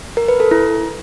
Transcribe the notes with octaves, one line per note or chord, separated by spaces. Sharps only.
A#4
B4
A4
E4